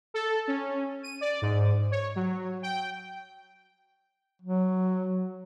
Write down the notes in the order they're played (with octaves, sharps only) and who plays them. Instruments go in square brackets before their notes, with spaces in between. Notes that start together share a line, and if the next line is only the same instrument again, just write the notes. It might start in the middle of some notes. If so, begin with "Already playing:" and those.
[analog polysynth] A4
C#4
D#7
D5
G#2
C#5
F#3
G5
[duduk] F#3